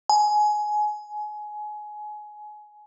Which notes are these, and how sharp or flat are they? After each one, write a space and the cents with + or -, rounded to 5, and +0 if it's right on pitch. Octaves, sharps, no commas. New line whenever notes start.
G#5 +20